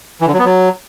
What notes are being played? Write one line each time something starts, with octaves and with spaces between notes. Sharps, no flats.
E3
D3
F#3
B3
F#3